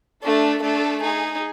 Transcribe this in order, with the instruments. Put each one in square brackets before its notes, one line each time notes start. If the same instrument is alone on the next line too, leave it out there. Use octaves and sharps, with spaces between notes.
[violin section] A3 A4 [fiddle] D4
[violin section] A3 A4 [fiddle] D4
[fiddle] D#4 [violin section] G#4